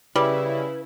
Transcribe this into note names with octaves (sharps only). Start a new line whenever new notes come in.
C#3 G3 E4 B4